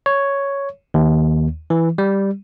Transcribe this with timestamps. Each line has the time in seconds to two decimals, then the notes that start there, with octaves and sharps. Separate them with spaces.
0.06 C#5
0.94 D#2
1.70 E3
1.98 G3